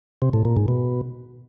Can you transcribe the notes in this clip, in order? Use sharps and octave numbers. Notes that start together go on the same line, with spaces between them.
C3
A2
A#2
G#2
B2